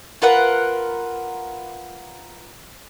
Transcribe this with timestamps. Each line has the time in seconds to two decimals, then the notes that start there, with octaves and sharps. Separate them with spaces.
0.22 F4 A#4 B4 F#5